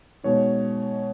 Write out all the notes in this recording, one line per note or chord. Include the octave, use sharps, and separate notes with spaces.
B2 G#3 D#4 C#5